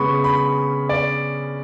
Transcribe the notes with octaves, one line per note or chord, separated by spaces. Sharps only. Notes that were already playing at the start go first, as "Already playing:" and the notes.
Already playing: C#3 G#3 B3 B5 C#6
B5
D5